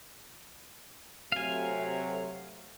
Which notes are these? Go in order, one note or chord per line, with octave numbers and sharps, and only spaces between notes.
C3 F#3 A3 F5 G#5